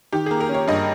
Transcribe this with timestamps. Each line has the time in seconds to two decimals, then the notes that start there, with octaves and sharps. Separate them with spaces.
0.12 D#3 G4
0.26 A#3 G#4
0.40 A#4
0.49 C#4
0.54 C#5
0.68 G2 D#5